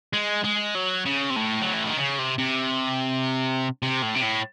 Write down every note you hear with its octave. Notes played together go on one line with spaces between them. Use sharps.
G#3
G#3
F#3
C#3
C3
A2
F#3
E3
D#3
C#3
C3
C3
C3
A2
C3
A2